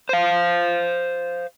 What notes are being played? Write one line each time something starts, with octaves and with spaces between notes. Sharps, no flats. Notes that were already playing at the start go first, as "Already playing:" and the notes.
C5 F5